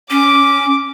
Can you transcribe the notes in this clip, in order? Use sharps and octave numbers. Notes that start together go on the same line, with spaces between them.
C#4 D6